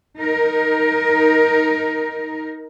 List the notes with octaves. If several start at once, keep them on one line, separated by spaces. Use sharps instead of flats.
D#4 A#4